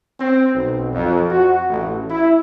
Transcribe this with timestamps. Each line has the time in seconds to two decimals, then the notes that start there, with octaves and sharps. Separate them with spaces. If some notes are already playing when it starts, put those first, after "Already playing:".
0.20 C4
0.54 B1
0.93 F2
1.31 F#4
1.70 A1
2.10 E4